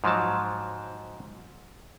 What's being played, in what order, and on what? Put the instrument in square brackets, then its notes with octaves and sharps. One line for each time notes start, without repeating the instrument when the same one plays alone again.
[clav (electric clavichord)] G#2 F3 F#3 A5